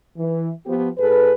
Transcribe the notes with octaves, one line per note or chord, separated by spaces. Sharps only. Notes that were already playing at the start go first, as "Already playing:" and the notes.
E3
F3 B3 G4
G#2 G#4 A4 B4